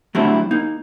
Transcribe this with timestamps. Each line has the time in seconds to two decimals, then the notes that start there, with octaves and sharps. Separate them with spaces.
0.15 F#3 G3 A3 C4 D4 E4
0.51 A#3 D#4